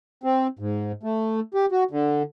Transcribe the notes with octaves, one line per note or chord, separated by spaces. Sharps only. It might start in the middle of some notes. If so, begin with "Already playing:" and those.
C4
G#2
A3
G4
F#4
D3